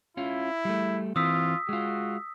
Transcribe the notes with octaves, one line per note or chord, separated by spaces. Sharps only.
C#4 E4 F4
G3 A3
E3 C4 F4 D#6 E6 B6
G#3 F4 F#4